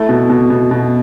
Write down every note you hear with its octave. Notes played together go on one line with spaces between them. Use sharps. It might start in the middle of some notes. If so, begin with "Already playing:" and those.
Already playing: A3 E4
B2
B2
B2
B2